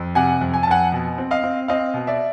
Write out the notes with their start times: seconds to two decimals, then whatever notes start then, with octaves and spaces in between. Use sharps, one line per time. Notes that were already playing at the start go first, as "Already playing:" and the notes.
Already playing: F2
0.15 C3 F#5 G#5
0.41 F2
0.54 G#5
0.63 A5
0.67 F2 F#5 G#5
0.92 B2
1.18 C4
1.31 D#5 F5
1.43 C4
1.68 C4 D#5 F5
1.94 B2
2.07 D5 E5